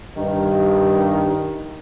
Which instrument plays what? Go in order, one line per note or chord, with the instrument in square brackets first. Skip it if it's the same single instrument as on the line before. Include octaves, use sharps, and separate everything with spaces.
[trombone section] G2 D#3